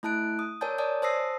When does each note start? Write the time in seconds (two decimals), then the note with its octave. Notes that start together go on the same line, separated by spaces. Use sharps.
0.03 A3 E4 A5 F#6 D7
0.39 D#6
0.61 A#4 C#5 D5 G#5 A5 G6
0.78 C#5 D5 G#5 A5 D#6
1.02 C5 A5 D#6 E6 A#6 C7